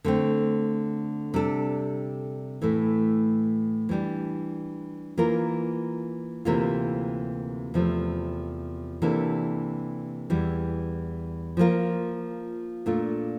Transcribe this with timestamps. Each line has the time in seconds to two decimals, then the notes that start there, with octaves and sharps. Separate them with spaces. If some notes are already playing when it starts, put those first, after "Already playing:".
0.04 D3 A3 C4
1.34 C3 G3 D4 A4
2.62 A2 E3 A3
3.89 E3 G3 D4
5.17 E3 A#3 F4 A#4
6.45 D2 C3 E3 A#3 F4
7.74 E2 C3 F3 A3
9.02 C3 E3 A#3 D4 A4
10.30 E2 E3 G3
11.57 F3 A#3 F4 A#4
12.86 A#2 A3 D4 F4